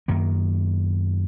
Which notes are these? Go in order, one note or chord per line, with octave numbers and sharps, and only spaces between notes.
F#2 D#3 A#3